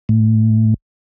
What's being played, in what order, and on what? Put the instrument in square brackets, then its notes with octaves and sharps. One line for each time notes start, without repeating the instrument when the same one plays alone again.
[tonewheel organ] A2